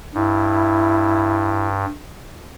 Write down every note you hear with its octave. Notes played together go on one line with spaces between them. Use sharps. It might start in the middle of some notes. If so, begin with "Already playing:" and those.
G2 E4